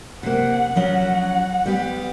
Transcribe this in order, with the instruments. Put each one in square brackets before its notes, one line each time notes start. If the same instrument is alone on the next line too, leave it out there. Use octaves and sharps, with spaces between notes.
[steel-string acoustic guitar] C3 A#3 [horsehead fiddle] F#5
[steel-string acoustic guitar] F3 F#3 C#4 [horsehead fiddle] F#5
[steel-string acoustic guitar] G3 B3 G4